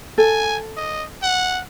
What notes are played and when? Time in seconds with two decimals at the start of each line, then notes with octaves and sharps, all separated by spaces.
0.18 A4 G#5
0.77 D#5
1.22 F#5